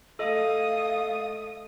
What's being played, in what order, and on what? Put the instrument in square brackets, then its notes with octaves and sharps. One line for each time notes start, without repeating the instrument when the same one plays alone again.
[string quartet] A3 D#6 [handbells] A4 D#5 [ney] F5